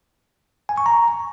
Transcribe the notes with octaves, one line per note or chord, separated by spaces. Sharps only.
G#5
C#6
A#5